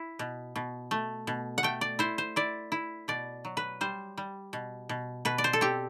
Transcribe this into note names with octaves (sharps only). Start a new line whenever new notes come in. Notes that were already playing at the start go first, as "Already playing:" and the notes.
Already playing: E4
B2
B2
A3
B2
F#5
A3 G5
D5
E4 C5
C5
E4 D5
E4
B2 D5
F#3
B4
G3 C5
G3
B2
B2
B2 B4
D5
C5
A4
C4 G4